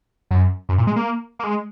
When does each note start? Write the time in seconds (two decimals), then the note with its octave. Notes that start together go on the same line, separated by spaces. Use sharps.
0.31 F#2
0.69 F#2
0.78 A#2
0.87 G#3
0.96 A#3
1.39 A#3
1.44 G#3